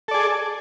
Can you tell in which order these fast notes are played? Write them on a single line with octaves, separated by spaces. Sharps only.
A4 D5 G#4